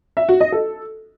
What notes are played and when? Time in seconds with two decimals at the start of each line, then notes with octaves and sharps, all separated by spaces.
0.17 E5
0.29 F#4
0.41 D#5
0.52 A4